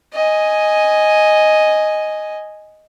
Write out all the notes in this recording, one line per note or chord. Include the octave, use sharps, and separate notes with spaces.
D#5 G#5